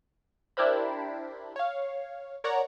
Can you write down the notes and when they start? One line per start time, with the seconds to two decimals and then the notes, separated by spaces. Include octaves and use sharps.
0.57 D4 E4 G4 A#4 C5 B5
1.56 C#5 F5
2.44 A#4 C#5 D5 F#5 A#5